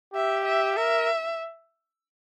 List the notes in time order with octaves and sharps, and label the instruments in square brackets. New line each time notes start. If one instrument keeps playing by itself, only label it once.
[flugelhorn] G4 [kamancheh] E5
[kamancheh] E5
[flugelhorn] A#4 [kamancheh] E5